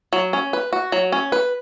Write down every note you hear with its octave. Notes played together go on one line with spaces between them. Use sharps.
F#3
C#4
B4
F#4
F#3
C#4
B4